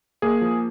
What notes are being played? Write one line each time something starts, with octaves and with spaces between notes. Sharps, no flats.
A#3 G#4
F3